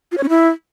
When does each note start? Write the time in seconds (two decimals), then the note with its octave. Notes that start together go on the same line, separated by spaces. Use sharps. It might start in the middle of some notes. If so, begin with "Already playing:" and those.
0.12 F4
0.18 C#5
0.23 C#4
0.29 E4